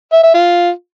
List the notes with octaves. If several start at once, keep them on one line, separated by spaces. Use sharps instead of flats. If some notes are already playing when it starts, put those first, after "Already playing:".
E5
E5
F4